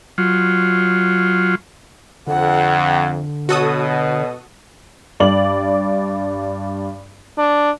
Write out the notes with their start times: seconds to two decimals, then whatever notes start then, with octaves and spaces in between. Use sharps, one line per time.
0.18 F#3 F4
2.27 F2 D3 F#5
3.49 B2 F#4 A4 C#5 D#6
5.20 G2 D5 F#7
7.38 D4